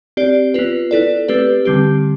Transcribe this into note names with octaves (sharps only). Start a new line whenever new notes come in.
C4 G4 D5
B3 F4 B4
B3 E4 A4 D5
A3 C4 G4 B4
D3 G3 C4 G4